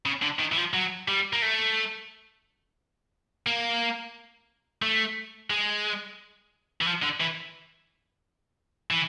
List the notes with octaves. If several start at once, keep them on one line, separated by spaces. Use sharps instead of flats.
C#3
D3
D#3
E3
F3
F#3
G3
A#3
A3
A#3
A3
G#3
E3
F3
D3
E3
E3